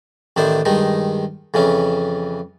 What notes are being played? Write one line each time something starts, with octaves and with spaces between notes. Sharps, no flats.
A1 D#3 D4 E4 C5
G2 D#3 G#3 D#4
F2 C#3 E3 C#4